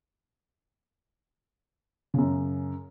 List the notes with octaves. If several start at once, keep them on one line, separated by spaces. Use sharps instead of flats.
F#2 C#3